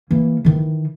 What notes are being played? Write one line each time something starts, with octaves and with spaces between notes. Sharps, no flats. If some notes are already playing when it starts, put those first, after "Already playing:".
E3 A#3
D#3 E3